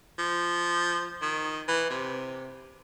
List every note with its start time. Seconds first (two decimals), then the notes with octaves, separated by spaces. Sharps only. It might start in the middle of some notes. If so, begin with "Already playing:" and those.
0.18 F3
1.22 D#3
1.68 E3
1.90 C3